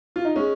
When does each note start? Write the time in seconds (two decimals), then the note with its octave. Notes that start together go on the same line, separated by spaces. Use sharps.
0.16 F4
0.25 D#4
0.36 G#3 C#4